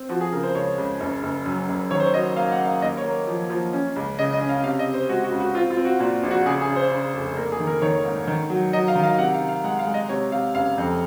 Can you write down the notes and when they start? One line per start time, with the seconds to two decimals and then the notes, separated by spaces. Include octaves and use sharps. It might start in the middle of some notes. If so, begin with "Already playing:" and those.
Already playing: C4
0.09 F3 F#4
0.21 G#4
0.32 C#3 A#4
0.43 C5
0.55 C#2 C#5
0.78 C#2
1.00 F#1
1.23 F#1
1.46 F#2
1.68 F#1
1.91 D#3 C#5
2.00 C5
2.07 C#5
2.14 F#3 D#5
2.36 A#3 F5
2.52 F#5
2.59 A#3
2.66 F5
2.82 D#2 D#5
2.97 C#5
3.05 A#3
3.27 F3
3.50 F3
3.73 C#4
3.96 C#2
4.19 C#3 D#5
4.33 D#5
4.40 C#4
4.49 F5
4.64 C3 F5
4.79 D#5
4.87 C3
4.94 C5
5.09 G#3 F#4
5.24 F#4
5.32 C#2
5.40 F#4
5.55 C4 F4
5.70 F4
5.77 C4
5.85 F#4
6.00 A#2 F#4
6.23 A#1
6.31 F#4
6.46 C#3 G#4
6.61 G#4
6.68 C#3
6.76 C5
6.91 C#3
7.14 F1
7.37 A#3 A#4
7.52 G#4
7.60 D#3
7.67 A#4
7.82 D#3 C#5
8.05 G#2
8.27 D#3
8.50 F#3
8.73 F#3 D#5
8.88 F5
8.95 D#3
9.03 F5
9.18 C3 F#5
9.34 F5
9.41 C3
9.49 F5
9.64 G#3 F#5
9.79 F5
9.87 G#3
9.94 D#5
10.09 C3 C#5
10.31 C3 F5
10.54 F#1 F5
10.78 F2